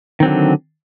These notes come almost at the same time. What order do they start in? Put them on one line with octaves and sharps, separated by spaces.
D#3 C4 F#3 D3